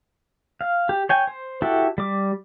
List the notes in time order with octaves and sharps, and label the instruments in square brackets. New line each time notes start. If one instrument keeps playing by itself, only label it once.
[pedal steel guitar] F5
G4
C#5 G5 G#5
C5
E4 F#4 G4 A4
G3 D6